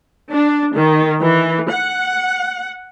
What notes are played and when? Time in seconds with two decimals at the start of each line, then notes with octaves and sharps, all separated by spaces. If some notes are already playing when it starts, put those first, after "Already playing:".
0.31 D4
0.75 D#3
1.21 E3
1.73 F#5